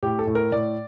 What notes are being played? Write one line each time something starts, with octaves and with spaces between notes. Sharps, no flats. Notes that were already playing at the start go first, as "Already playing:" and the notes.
A2 G4
A4
A2
A#4
A2 D5